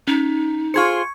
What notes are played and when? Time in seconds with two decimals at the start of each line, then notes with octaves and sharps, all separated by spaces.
0.08 C#4 D#4
0.74 F4 G#4 C5 C#6 G#6 C#7